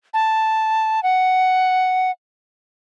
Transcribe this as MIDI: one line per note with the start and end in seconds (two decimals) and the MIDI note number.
0.14 1.03 81
1.03 2.11 78